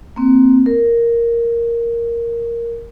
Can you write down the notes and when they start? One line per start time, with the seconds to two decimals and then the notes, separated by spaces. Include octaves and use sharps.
0.16 A#3 C4
0.66 A#4